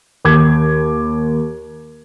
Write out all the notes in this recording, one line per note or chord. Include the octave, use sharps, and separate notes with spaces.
D#2 D6 G#6